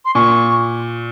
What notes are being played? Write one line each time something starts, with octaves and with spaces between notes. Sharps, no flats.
C6
A#2 C#6